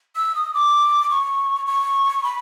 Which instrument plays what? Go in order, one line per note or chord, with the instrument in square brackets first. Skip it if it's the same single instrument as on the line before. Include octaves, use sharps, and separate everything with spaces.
[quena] E6
D#6
D6
C#6
C#6
B5